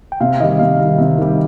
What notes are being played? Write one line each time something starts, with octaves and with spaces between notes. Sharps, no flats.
G5
C3 F5
D#3 G3 D#5
C3 F5
D#3 G3
C3
D#3 G3